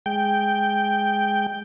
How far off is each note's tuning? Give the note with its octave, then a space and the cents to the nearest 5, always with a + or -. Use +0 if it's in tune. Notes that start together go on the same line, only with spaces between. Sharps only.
G#3 +0 G5 +0